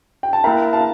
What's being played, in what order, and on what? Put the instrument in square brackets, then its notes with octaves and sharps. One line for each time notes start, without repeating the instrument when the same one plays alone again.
[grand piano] G5
A5
[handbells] A#3 E4 A#4 E5 [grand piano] G5 A#5
[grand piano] F5 A5